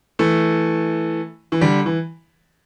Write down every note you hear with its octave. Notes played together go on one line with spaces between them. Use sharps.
E3 A3
E3
D3 G3
E3